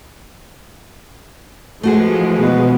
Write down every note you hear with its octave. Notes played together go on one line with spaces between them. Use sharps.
E3 F3 G#3 A3 F#4 G#4
B2